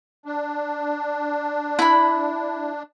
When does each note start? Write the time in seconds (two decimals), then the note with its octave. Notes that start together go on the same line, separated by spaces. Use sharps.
0.26 D4
1.79 E4 B5